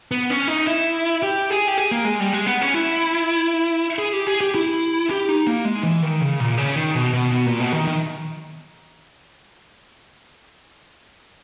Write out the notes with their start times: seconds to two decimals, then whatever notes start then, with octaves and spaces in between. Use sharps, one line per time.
0.11 B3
0.30 C#4
0.48 D#4
0.67 E4
1.23 G4
1.50 G#4
1.67 G4
1.78 G#4
1.92 A#3
2.05 G#3
2.20 G3
2.33 G#3
2.46 B3
2.61 C#4
2.74 E4
3.99 G#4
4.13 G4
4.27 G#4
4.41 G4
4.55 E4
5.11 G4
5.29 D#4
5.47 A#3
5.65 G#3
5.83 E3
6.02 D#3
6.21 C#3
6.40 A#2
6.58 C#3
6.76 D#3
6.95 B2
7.13 B2
7.32 B2
7.46 A#2
7.60 B2
7.73 D#3
7.87 D#3